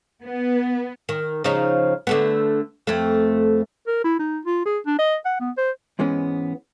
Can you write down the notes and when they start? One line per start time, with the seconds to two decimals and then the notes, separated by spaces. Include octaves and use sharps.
0.22 B3
1.09 D#3
1.44 C#3 F3 D#4
2.07 D3 A3 B3
2.87 F2 A3
3.87 A#4
4.04 E4
4.19 D#4
4.45 F4
4.66 G#4
4.86 D4
4.99 D#5
5.25 F#5
5.40 B3
5.57 C5
5.99 G#2 E3 G#3 B3 C#4